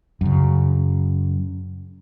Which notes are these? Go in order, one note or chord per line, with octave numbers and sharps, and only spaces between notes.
F#2 C#3